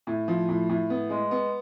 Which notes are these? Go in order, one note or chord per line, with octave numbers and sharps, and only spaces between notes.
A2
F3
A2
A2
B3
G#3
B3